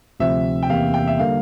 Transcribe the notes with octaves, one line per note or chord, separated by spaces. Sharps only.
D2 C3 F3 C4 E5
G5
E2 C3 E3 A#3 F5
G5
E5
D3 G3 A#3 F5